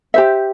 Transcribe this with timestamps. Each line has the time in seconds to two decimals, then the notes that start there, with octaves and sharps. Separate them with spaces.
0.14 G4 C5 E5